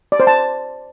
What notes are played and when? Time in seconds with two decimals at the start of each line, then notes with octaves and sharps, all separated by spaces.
0.12 D5
0.20 C5
0.27 A5